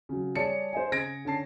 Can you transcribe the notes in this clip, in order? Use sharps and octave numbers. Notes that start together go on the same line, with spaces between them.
C#3 F#3
G3 G#4 C#5 D5 A5 C#7
C5 D#5 G#5
C#3 G#4 G#6 A#6 D7
D3 C#4 A5 C7